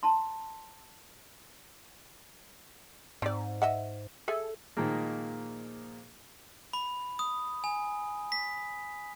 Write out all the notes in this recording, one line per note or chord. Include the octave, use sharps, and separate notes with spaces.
A5 A#5 C6
G#2 C4 D5
D#5 E5 F#5
G#4 A4 E5
A#2 D#3 F3 G#3 A#3
B5
D#6
G#5
B6